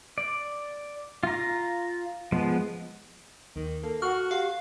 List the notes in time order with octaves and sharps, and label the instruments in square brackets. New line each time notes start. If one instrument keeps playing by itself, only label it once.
[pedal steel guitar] D5
F4 A#5
F3 G#3 B3
[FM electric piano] D#2 [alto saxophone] D#3
[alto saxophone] A#3 [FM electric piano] A4
[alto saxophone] F#4 [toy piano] F#5 C#6 [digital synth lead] F6
[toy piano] G4 F#5 [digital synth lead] F5